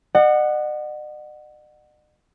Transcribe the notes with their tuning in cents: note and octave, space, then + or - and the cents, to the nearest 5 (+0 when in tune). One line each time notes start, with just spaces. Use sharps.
D#5 -45 F#5 +0